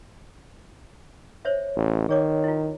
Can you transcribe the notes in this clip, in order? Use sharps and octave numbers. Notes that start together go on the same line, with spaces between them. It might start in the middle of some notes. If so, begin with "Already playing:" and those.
C5 C#5 E5
A1
D#3 G#4 C#5 D6
E4 F4